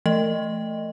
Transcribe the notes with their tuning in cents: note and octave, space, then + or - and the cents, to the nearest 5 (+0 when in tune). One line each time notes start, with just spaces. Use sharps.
E3 +45 A3 +0 D#5 +0